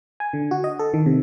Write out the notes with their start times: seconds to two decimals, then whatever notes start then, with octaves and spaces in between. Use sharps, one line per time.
0.20 G#5
0.33 D3
0.51 F#4
0.64 D#5
0.79 A4
0.94 D#3
1.06 C3